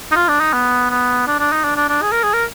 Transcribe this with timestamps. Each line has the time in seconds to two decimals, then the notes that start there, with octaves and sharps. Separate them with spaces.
0.12 D#4
0.16 F4
0.28 D4
0.41 D#4
0.53 B3
0.90 B3
1.27 D4
1.40 D4
1.52 D#4
1.65 D4
1.77 D4
1.89 D4
2.02 G#4
2.12 A#4
2.23 G#4
2.34 A#4